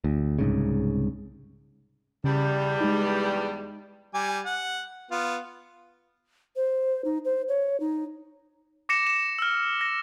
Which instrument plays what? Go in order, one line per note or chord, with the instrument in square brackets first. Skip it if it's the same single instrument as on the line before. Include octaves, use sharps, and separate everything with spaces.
[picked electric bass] D2
C2 G#2 C#3
[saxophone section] E2 G3 [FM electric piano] C#3
[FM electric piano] G#3 D#4
[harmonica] G3 G#5 D6
F#5
B3 F4
[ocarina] C5
D#4
C5
C#5
D#4
[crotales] D6 A#6 C#7 E7
E7
E6 F6
A#6